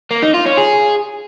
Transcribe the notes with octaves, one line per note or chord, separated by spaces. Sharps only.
A#3
D#4
F4
C#4
G#4